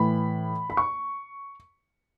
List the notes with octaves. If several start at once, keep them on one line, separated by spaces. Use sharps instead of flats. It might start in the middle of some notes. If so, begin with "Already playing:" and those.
Already playing: A2 E3 B5
B5
C#6